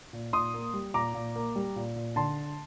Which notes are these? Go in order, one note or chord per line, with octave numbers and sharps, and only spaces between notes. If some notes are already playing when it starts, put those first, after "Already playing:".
A#2
A#2 C6 D#6
A#3
G3
A#2 A#5 D6
A#2
A#3
G3
A#2
A#2
D3 A5 C6